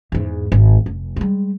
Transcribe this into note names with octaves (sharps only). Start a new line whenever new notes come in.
E2 G#2
G#1
F1
G3 G#3